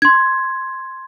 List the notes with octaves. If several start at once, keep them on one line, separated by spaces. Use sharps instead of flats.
C6 G#6